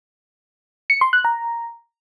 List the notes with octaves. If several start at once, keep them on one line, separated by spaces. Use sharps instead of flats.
C#7
C6
F#6
A#5